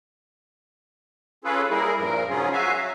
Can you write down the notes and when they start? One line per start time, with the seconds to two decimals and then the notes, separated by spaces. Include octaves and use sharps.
1.44 C#4 F4 G#4 A4 B4
1.70 G3 A#3 E4 G#4 A#4
1.98 G2 A#2 F3 A#4
2.29 G#2 C#3 F#3 C#4 F4 G#4
2.53 F#4 E5 F5 G#5
2.73 F#3